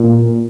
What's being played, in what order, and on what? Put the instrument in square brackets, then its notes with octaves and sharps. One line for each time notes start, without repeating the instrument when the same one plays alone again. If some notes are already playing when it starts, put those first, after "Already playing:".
Already playing: [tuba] A#2